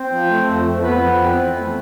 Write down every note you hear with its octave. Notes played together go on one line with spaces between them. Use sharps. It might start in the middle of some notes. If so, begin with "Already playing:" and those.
Already playing: C4 C5
F3
A3
F2
F2
F2 B3 B4
F2
C4
E3
A3